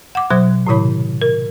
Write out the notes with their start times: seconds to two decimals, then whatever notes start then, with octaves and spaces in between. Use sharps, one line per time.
0.15 F#5 D6
0.30 B2 F#3 C5 D#6 G#6
0.67 A2 C3 D#3 E4 C#5 B5
1.22 A#4